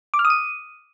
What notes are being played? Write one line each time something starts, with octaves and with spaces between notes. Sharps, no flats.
D6
F6
D#6
D#7